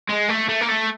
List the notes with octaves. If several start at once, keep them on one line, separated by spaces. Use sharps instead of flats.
G#3
A3
A3
A#3
A3